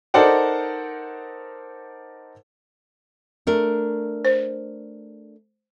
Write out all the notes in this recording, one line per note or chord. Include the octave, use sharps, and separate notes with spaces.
D#4 A4 A#4 C5 D5 F#5
A3 D4 A#4
C5